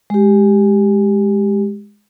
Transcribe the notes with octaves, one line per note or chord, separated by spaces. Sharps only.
G#3 G4